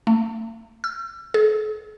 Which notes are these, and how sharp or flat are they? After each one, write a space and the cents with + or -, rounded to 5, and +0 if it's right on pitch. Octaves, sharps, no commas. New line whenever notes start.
A3 +40
E6 +40
A4 -45